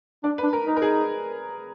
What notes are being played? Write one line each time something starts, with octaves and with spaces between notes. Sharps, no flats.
D4 D5
B4
D4
A#4
D#4 A#4
A#4
G#4